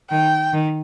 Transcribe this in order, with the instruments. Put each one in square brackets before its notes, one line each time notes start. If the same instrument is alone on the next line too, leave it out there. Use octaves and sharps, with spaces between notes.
[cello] D#3 [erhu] G5
[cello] D#3